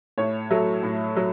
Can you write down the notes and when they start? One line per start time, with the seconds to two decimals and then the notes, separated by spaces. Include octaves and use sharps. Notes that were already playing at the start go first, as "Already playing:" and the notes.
0.18 A2 C#5
0.51 F#3 A3
0.83 A2
1.16 F#3